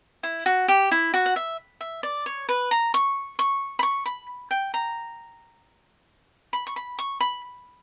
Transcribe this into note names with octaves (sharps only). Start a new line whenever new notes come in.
E4
F#4
G4
E4
F#4
F#5
E5
E5
D5
C#5
B4
A#5
C#6
C#6
B5
C#6
B5
G5
A#5
B5
C#6
B5
C#6
B5